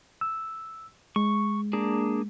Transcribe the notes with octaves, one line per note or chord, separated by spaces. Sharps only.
E6
G#3 C#6
A#3 D4 G#4